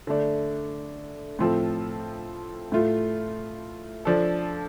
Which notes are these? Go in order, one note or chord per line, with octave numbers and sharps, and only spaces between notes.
D3 A3 D4
A2 F3 C4 F4 A4
A2 A3 F4
F3 D4 A4